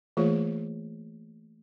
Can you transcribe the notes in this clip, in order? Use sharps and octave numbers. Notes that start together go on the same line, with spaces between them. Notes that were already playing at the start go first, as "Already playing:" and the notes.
E3 A3 A#3 F4 G#4 C#5